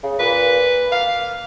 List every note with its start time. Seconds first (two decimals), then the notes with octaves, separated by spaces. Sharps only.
0.03 C#3
0.19 A#2 B4
0.92 A#3 F5